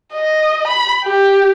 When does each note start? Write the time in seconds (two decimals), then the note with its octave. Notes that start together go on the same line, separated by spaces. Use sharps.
0.13 D#5
0.67 B5
1.04 G4